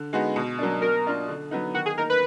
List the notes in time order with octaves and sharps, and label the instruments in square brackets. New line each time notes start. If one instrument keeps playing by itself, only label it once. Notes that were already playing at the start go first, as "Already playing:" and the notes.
Already playing: [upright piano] D3
G#3 B3 D#4 F#4
B2
F#3 A#3 D4
[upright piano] B2 [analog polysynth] A#4
[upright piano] A#3 D4 F4
D3
F#3 B3 D#4
[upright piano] D#3 [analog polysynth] F#4
[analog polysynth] G#4
[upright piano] A#3 D#4 [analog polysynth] A#4
[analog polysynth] B4